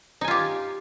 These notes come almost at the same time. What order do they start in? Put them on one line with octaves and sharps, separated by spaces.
D#4 G#5 F4 G4